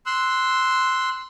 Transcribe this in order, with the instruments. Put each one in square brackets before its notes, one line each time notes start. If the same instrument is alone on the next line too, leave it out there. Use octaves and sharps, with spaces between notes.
[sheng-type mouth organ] C6 E6 F#6